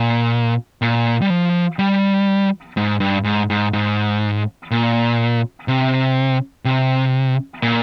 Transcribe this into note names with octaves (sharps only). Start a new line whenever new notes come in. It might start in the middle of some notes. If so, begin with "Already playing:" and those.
Already playing: A#2
A#2
G3
F3
G3
G#2
G2
G#2
G#2
G#2
A#2
C3
C3
A#2